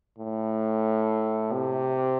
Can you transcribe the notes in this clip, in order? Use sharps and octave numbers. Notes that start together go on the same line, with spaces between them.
A2
C3